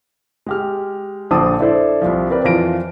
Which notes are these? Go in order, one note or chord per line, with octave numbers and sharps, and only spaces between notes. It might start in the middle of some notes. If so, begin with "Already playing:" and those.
G#3 G4 F6
A#1 D3 C5 A5 D6 D#6
D4 E4 A4 C5 D5
C2 F3
C4 A#4 B4 D5
F2 E3 F4 A#6 D7